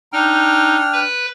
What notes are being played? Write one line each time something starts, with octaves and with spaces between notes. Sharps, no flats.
D4 D#4 G5 F6
B4